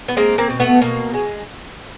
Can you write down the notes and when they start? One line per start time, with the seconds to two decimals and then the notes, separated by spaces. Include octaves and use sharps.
0.08 B3
0.17 G#3 A#3 C4
0.38 A#3 C4
0.50 B2
0.60 A3 B3
0.81 B2 A#3
1.14 G#3